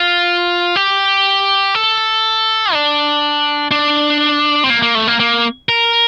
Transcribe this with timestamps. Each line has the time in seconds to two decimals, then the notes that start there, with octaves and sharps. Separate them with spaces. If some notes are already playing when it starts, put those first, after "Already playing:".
Already playing: F4
0.76 G4
1.75 A4
2.73 D4
3.71 D4
4.64 C4
4.70 A#3
4.82 A#3
4.95 A3
5.07 A#3
5.20 A#3
5.69 A#4